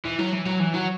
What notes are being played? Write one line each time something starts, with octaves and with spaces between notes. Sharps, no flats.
E3
F#3
E3
F#3
E3
F#3